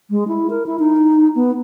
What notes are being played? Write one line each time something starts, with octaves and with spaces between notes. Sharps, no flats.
G#3
E4
A#4
E4
D#4
B3